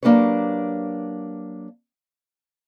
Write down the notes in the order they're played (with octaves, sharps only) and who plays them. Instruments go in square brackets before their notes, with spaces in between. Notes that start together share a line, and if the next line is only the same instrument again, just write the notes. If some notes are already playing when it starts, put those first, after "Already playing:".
[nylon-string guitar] F#3 A#3 D4 G4 B4 C#5